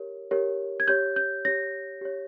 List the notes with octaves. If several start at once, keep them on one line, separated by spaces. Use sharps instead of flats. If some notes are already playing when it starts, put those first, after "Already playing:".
Already playing: G4 A#4 C#5
G4 A#4 C#5
G#6
G4 C#5 G6
G6
G4 C#5 A#6
G4 C#5